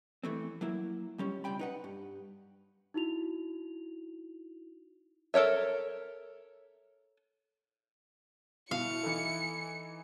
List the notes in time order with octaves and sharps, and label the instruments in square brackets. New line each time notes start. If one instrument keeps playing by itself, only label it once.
[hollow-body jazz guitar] E3 A3 C4
F#3 A#3 E4
C#2 G3 C#4
C#2 C3 G3 G5 B5
D#4 B4 F#5
G2
[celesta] D#4 E4 F#4 F7
[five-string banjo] A4 A#4 C#5 E5
[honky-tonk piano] B2 [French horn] E4 [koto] F5 [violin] C#7
[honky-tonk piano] E3 D#4 A4